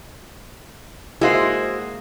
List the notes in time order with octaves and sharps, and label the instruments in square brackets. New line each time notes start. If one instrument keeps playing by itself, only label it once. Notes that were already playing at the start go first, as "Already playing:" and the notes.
[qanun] G#3 A#3 [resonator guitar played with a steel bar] E4 F#4 C5